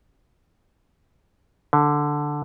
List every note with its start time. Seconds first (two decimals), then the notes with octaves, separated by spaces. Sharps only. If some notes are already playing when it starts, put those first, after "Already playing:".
1.73 D3